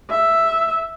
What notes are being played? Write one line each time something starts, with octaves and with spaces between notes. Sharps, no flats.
E5